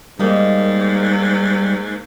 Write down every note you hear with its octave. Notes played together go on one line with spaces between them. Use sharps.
G#2 G3 A#3 D#4